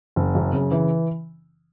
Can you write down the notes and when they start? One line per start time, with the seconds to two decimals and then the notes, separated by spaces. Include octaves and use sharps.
0.16 F#1
0.35 F#2
0.53 C#3
0.71 E3